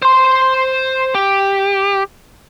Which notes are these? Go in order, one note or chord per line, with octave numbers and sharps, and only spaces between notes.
C5 C6
G4